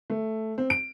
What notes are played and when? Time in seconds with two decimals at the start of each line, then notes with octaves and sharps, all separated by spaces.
0.10 A3
0.58 C4
0.70 D7